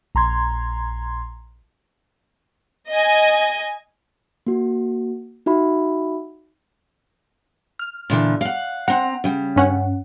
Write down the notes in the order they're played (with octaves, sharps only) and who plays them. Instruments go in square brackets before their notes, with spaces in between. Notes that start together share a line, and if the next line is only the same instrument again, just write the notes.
[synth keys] A#1 A#5 C6 G#6
[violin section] D#5 G#5
[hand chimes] A#3 F#4
D#4 F#4 E5 B5
[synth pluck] F6
[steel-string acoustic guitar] A#2 D3 E3
F5 F#5
[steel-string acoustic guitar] C4 A#5 [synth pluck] F#5
[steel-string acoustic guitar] C#3 G3
[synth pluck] G2 C#4 F#5